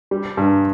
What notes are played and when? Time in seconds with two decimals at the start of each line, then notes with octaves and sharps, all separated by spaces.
0.11 G3
0.37 G2